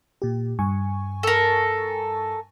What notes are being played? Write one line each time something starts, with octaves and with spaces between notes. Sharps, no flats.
A#2 G4
G2 G#5 C#6
A4 A#4